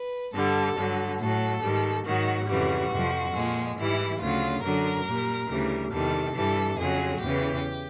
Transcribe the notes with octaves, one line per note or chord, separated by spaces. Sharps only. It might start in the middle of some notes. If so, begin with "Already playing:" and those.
Already playing: B4
G2 D3 G3 A4
G2 D3 F#3
A2 F#3 A4
G#2 D#3 G3
G#2 D#3 F#3 F#4
F2 C#3 E3 G3 F#4
F2 C3 F3
A#2 F3 G#3
G#2 E3 G3 E4
D2 C#3 F#3 F4
F#2 D3 F#3 A#4
A#2 G3
D2 C#3 E3 G3
E2 C3 D#3 G3 A4
G2 E3 G3 A4
F2 C#3 F#3 G#4
E2 C#3 E3 G4